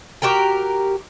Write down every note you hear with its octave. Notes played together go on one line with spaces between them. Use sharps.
F#4 G4 A#4 G5